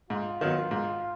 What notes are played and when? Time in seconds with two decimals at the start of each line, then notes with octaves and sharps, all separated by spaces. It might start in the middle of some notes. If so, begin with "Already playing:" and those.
0.10 G#2 F4
0.41 D#3 F#3 B3
0.71 G#2